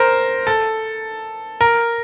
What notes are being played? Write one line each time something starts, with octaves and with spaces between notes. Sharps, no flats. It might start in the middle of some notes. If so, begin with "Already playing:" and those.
Already playing: A#4 C5
A4
A#4